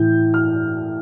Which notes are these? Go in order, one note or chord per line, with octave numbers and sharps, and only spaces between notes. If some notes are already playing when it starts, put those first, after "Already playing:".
Already playing: A2 E3 G6
F6